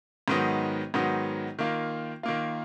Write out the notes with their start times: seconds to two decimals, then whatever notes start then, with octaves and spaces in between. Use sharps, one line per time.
0.28 G#2 D#3 F#3 B3 D#4
0.94 G#2 D#3 F#3 B3 D#4
1.59 D#3 A#3 F4
2.23 D#3 A#3 F4